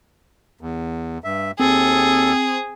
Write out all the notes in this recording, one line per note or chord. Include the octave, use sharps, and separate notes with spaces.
E2
G2 E5
D#2 C4 G#4 A4